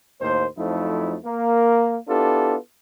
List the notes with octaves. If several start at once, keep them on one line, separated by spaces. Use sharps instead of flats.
D#2 A2 A#3 C5
F2 F3 F#3 A3 D#4 E4
A#3 A#4
B3 D4 E4 F4 G4 A4